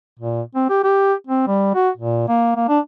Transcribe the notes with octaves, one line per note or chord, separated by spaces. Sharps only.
A#2
C4
G4
G4
C4
G3
F#4
A#2
A#3
A#3
D4